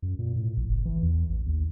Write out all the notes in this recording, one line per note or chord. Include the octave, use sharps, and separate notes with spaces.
F#2
A#2
A2
A#1
F#1
E3
E2
A1
D#2